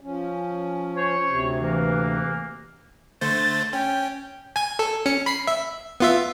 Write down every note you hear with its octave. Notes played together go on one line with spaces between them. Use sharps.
F3 C#4
C5 C#5
D2 C3
E3 A#3
D3 A3 C5 A6
C#4 G5
G#5 G#6
A4
C#4 C#7
B5 B6 C7
E5
B3 F4 E5